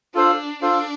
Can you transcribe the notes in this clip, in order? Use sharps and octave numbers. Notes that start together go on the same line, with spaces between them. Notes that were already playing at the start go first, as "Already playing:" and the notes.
D4 F4 A4 C5 F5
D4 F4 A4 C5 F5